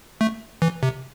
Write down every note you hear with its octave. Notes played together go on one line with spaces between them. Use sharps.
A3
E3
C3